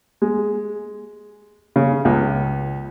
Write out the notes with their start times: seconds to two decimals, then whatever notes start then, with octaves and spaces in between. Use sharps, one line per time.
0.22 G#3
1.76 C#3
2.05 C#2